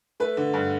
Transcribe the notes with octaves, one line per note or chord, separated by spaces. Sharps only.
A3 B4
D3
G2